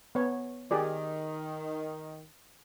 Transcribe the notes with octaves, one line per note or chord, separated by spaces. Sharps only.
B3 C#5
D#3 G4 G#4 D5